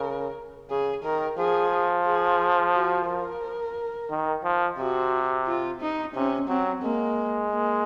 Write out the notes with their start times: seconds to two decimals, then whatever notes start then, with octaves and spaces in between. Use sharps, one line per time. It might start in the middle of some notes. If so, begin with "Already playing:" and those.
Already playing: C#3 A#4
0.70 C#3 G#4
1.03 D#3 A#4
1.38 F3 G#4
2.06 G#4
2.74 F#4
3.08 A#4
4.10 D#3
4.44 F3
4.78 C3 F#4
5.47 F4
5.81 D#4
6.15 C3 C#4
6.48 F#3 C4
6.82 G#3 A#3
7.51 A#3